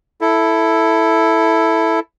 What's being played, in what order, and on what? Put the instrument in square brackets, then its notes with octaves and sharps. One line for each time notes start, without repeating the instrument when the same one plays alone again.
[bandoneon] E4 A4